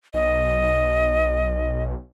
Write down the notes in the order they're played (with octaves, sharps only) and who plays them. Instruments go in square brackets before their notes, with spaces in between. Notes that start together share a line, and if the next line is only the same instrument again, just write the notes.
[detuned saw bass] B1 [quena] D#5